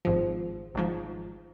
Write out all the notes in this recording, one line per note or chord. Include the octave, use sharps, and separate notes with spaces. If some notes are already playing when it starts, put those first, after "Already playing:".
G#1 G#2 F3
G#1 G#2 F3